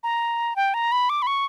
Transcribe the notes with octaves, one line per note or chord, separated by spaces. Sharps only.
A#5
G5
A#5
B5
D6
B5
C#6